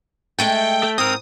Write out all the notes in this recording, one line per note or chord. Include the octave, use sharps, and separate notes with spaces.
G#3 A3 A4 G5
A3
G#2 C4 A#4 D#6